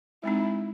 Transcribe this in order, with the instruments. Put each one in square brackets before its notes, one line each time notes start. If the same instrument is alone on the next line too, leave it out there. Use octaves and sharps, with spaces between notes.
[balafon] G#3 C4 D#4 [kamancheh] E4